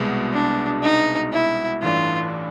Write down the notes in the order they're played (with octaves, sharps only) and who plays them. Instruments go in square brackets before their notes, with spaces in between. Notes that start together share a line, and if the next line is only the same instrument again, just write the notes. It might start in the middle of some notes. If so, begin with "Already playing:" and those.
Already playing: [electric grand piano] C2 B2 G#3 B3
[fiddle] D4
D#4
E4
[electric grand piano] A1 G2 E3 A3 D4 [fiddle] F4